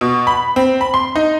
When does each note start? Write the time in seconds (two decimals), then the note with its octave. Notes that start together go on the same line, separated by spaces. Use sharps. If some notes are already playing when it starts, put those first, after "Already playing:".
0.01 B2
0.27 B5
0.56 C4
0.81 B5
0.94 C6
1.15 D#4